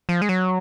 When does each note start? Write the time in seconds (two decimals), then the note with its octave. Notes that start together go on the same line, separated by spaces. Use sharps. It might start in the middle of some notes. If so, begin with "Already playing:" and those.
0.09 F3
0.22 G#3
0.29 F#3